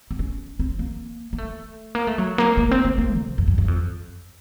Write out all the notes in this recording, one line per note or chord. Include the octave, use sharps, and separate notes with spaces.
C4
C#4
C4
A#3
A#3
A3
A#3
A3
F#3
A#3
A#3
C4
A#3
A#3
C3
F2
F#2
F#2
F2